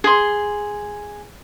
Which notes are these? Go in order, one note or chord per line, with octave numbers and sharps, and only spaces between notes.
G#4 C6